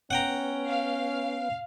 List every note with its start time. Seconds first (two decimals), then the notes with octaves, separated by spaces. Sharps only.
0.11 B3 C#4 F#5 G5 A#5
0.67 F5